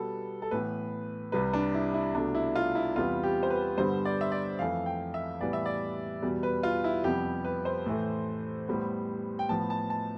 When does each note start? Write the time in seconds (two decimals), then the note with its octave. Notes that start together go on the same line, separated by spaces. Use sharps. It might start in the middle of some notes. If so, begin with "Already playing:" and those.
Already playing: B2 G3 B3 A4
0.42 A4
0.51 A2 E3 B3 B4
1.32 C2 C3 G3 B4
1.53 D4
1.74 E4
1.94 E4
2.14 C2 B2 A3 D4
2.35 E4
2.55 F4
2.75 E4
2.96 E2 C3 G3 B3 F4
3.23 G4
3.43 C5
3.50 B4
3.78 G2 D3 G3 B3 C5
4.05 D5
4.21 E5
4.32 D5
4.59 F2 E3 A3 F5
4.86 G5
5.14 E5
5.41 A2 E3 G3 B3 D5
5.53 E5
5.66 D5
6.22 E2 B2 G3
6.43 B4
6.63 F4
6.84 E4
7.04 F2 C3 G3 B3 G4
7.44 B4
7.65 C5
7.86 A2 E3 A3
8.68 A2 G3 B3
9.39 G5
9.49 A2 F3 B3 A5
9.70 A5
9.90 A5